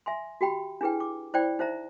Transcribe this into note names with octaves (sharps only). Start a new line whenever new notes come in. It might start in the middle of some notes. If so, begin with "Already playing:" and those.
E5 G#5 C6
F#4 G4 G5 B5
D4 E4 G#4 B4 G5
D6
E4 C5 D5 G5 B5
D#4 C5 E5 A#5